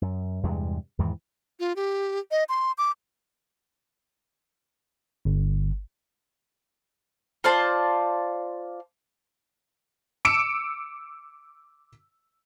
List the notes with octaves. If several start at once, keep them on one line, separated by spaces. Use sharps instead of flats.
F#2
E2 G2 C3 G#3
E2 G#2 D#3 E3
F4
G4
D#5
C6
D6
G1
F4 C5 D5 A5
D6 E6 C#7 D7 E7